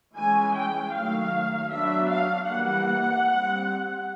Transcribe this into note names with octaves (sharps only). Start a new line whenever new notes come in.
E3 G#3 C#4 G#5
G5
D#3 F#3 A3 F5
F#3 B3 D4 E5
F5
E3 G3 A#3 F#5
G3 C4